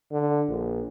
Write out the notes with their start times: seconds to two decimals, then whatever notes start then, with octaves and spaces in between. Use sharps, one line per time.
0.12 D3
0.48 A#1